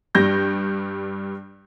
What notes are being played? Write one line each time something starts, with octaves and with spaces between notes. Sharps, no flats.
G2 G3 G6 A#6